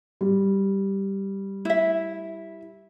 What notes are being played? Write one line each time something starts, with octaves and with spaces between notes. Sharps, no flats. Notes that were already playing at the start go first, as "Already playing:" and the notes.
G3
E4 E5